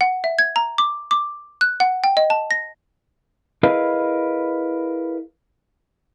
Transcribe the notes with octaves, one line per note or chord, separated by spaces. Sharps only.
F#5
E5
G#6
A#5
D6
D6
F#6
F#5
G5
D#5
A5
A#6
E4 G#4 A#4 B4 D#5 F5